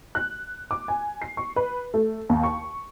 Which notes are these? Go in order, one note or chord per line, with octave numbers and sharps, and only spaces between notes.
F#6
D6
G#5
C7
C#6
B4
A3
D#2
C#6